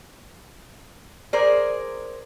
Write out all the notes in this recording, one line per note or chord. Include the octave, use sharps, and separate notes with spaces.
G#4 A#4 C5 D5